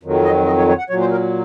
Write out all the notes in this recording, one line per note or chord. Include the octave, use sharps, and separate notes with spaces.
F2 D#3 F#3
D#5
D#5
C#5
C#5
F#5
A#2 F#3 C#5
C5
A#4